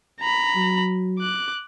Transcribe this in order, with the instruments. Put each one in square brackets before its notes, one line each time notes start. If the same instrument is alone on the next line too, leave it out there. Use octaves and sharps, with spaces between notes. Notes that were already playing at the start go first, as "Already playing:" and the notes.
[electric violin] A#5 B5
[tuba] F#3
[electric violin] D6 F#6